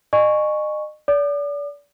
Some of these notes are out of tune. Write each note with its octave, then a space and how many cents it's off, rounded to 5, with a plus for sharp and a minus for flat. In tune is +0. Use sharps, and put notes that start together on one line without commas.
D#5 -35 G#5 +0 C#6 +0
D5 -35 D6 +40